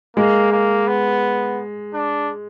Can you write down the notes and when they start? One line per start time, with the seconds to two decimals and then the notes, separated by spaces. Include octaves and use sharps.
0.17 G#3 A#3
0.52 A#3
0.87 B3
1.94 D4